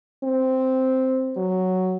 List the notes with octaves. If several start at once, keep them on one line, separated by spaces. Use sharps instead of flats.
C4
F#3